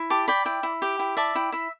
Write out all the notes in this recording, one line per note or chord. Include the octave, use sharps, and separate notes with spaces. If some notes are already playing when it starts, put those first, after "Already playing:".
Already playing: E4
G4 A5 D6
D5 G5 B5
E4 G5
E4
G4 G5
E4 G5
D5 E5 A5
E4 G5
E4 E5